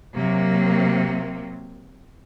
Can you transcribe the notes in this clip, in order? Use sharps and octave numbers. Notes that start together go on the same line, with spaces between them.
C3 F#3 A#3